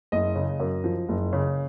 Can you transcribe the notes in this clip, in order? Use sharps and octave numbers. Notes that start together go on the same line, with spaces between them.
F#1 D#5
C#3
F#2
F3
F#1
C#3